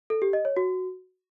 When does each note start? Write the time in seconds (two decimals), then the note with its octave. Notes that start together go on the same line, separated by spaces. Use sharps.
0.10 A4
0.22 G4
0.33 D#5
0.45 C#5
0.57 F#4